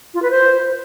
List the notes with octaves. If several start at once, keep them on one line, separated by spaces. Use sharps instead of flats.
F4
B4
C5